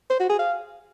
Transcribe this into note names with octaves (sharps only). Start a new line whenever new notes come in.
C5
F#4
G#4
F5